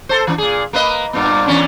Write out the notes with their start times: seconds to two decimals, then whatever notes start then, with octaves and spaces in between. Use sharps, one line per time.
0.09 A4 C5
0.27 E3 C4 D4
0.38 A#2 G#4
0.73 A#3 B4 D#5
1.13 G2 A#2 B3
1.46 E2 C#4 D4